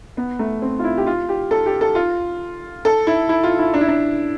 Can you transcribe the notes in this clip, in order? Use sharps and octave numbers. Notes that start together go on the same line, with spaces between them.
B3
A3
C4
F4
E4
G4
F4
G4
A4
G4
A4
F4
A4
E4
E4
F4
E4
D4
E4
D4